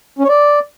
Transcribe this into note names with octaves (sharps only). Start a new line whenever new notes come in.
C#4
C#5
D5